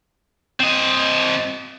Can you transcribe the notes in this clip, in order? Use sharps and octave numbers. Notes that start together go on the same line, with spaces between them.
C4 D#5